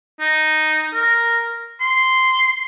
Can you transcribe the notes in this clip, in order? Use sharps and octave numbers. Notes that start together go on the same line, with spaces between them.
D#4
A#4
C6